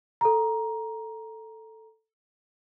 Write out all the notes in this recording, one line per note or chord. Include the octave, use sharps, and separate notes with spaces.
A4 A#5